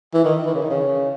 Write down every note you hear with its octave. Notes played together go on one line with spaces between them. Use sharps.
E3
D#3
E3
C#3
D#3
C#3